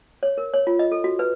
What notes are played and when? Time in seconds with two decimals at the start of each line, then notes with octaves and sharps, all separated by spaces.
0.23 C#5
0.38 A#4
0.53 C#5
0.67 F4
0.79 D#5
0.92 A4
1.04 F#4
1.19 B4